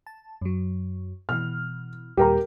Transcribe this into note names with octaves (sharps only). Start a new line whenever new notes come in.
A5
F#2 F#3
B2 E3 F6
D#2 A#2 G3 G4 A#4 A#5